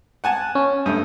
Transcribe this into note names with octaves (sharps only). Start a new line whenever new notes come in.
F#5 G#5 A5
C#4
G2 A3 D#6